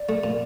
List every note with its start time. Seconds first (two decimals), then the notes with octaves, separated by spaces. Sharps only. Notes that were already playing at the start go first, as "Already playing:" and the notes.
Already playing: D5
0.09 A3
0.24 A#2